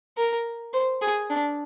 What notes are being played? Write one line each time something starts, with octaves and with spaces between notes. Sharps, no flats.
A#4
C5
G#4
D4